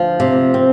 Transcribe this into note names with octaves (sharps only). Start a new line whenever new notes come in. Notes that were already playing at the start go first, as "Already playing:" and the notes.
Already playing: D2 F3
C3
C4